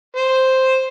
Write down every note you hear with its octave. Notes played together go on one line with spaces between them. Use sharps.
C5